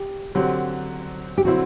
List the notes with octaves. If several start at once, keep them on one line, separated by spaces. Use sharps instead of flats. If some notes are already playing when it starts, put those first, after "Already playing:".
Already playing: G4
D3 F#3 C4 G4
G4
D3 F#3 C4 E4 F#4